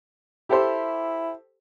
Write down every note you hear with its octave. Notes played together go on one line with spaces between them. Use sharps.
E4 G4 A4 C5